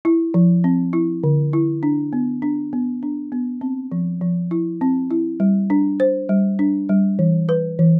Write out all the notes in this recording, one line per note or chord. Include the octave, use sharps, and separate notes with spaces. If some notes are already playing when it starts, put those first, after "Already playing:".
E4
F3
C4
E4
D3
E4
D4
B3
D4
B3
D4
B3
C4
F3
F3
E4
C4
E4
G3
D4
C5
G3
D4
G3
E3
B4
E3